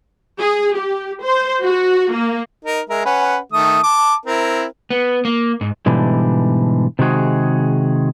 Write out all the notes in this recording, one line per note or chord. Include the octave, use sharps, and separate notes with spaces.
G#4
G4
C5
F#4
A#3
D#4 A#4
G#3 A#4 E5
C#4 B4 F#5
D#3 A3 D#6
A5 D6
C4 E4 A#4
B3
A#3
G#2
G#2 B2 D3 E3 G3
C3 D#3 G#3 F#4 G#4